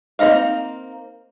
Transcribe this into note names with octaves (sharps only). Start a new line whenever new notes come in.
A#3 C4 D#4 D#5 F5